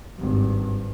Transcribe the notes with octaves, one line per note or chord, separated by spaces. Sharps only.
G#1 G2